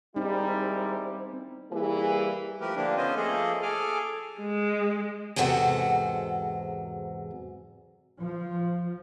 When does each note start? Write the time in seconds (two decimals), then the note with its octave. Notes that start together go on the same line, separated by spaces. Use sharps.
0.16 G3 G#3 A#3 C4 D#4 E4
1.71 E3 G3 A#3 G#4
2.61 F3 A3 G4 A#4 B4
2.76 D3 F3 A#3 D4 G4
2.97 B3 C#4 F4 C5 D#5 G#5
3.16 F3 A3 A#3 G#4 A4 D#5
3.62 G#4 A4 G#5 D6 F6
4.40 G#3
5.36 E2 G#2 C3 F#3 A4 F#5
8.21 F3